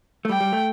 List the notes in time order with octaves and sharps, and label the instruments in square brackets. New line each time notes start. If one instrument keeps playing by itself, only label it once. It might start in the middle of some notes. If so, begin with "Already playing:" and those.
[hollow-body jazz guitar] A3
[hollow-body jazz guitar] G3 [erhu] G5
[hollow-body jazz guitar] G3
A3